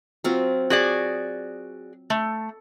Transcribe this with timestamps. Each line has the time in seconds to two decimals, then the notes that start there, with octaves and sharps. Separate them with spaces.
0.24 F#3 C4 F4
0.70 F#4 G#4 D5
2.10 A3